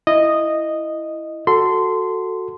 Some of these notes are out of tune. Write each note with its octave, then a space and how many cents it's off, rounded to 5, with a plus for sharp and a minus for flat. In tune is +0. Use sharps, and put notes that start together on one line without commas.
E4 +5 D#5 -10
F#4 +0 A4 +10 C6 -15